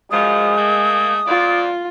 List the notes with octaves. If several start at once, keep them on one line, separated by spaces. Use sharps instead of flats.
F#2 F3 G#3 D#6
A3 A#3
F2 F4 D5